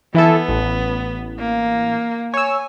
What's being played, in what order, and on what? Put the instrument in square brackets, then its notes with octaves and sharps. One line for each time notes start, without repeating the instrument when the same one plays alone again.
[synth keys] E3 E4 A4 [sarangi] B3
[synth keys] A1
[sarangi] A#3
[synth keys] C#5 E6 [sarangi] G#5